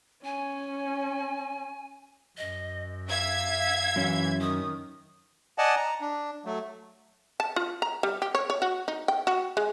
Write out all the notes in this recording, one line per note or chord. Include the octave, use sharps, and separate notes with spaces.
C#4 G#5
F#2 D#5
E5 F5 G#6
F#2 E3 C#4
D#3 D#6
D5 D#5 F#5 G#5 A5
A#5
D4
F#3 A3
A5
F4
A#5
G3
G4
C#5
C#5
F#4
D#4
G5
F#4
G#3